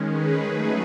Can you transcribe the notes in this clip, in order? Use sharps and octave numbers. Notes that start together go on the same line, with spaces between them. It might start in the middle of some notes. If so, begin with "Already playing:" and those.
Already playing: D#3 G#3 C#4
G#4 B4
F#3 A3 D#4